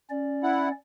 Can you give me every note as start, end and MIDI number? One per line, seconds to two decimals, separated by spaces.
0.10 0.71 61
0.10 0.71 74
0.43 0.69 64
0.43 0.69 78